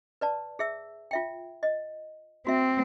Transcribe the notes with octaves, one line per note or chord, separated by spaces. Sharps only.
B4 D5 A5
G#4 E5 E6
F4 E5 G5
D#5
C4 F#4 E5